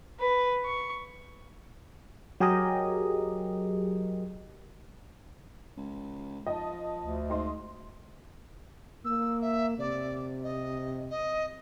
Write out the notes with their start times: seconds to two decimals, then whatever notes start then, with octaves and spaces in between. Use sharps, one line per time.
0.20 B4
0.65 C#6
2.40 F#3 G4 G#4 A#4 D#5
5.77 C#2
6.47 F3 D#5 A5
7.00 D2
7.30 G#2 D#5 C6
9.05 A#3 E6
9.41 E5
9.79 C3 D5
10.43 D#5
11.11 D#5